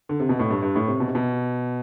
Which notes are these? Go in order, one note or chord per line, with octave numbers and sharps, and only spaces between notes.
D3
C3
B2
A2
G2
G2
A2
C3
B2
C3
B2